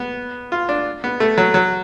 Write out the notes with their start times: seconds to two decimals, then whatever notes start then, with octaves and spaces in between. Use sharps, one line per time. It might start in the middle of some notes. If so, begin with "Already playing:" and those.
Already playing: B3
0.52 F4
0.69 D4
1.04 B3
1.20 A3
1.38 F#3
1.54 F#3